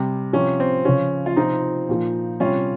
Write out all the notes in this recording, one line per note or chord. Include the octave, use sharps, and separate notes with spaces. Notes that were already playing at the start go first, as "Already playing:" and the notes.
Already playing: C3 G3
C3 F3 C#4
C4
C#3 F3 C#4
F4
C3 F3 C4 D#4
A#2 F3
C3 G3 C#4 F4